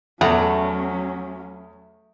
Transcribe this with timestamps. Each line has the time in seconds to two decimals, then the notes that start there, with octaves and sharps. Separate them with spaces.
0.21 E2 F#3 A3 C#4 F#5 A#5